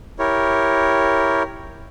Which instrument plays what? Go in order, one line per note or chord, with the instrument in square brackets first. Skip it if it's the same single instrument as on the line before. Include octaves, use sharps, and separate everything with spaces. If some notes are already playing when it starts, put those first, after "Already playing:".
[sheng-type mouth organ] E4 G4 A#4 C#5